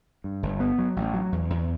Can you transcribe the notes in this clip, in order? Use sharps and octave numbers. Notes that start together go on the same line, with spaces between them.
G2
G1
B3
F#3
A1
F#3
E2
E2